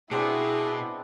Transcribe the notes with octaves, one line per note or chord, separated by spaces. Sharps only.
B2 B3 C4 D4 E4 G#4